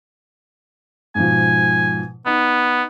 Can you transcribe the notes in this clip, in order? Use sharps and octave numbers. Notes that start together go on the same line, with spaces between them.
G#2 B2 F3 G#5
B3 D#4